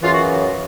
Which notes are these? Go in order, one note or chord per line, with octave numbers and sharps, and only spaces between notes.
F#2 C#3 E3 F4
F#4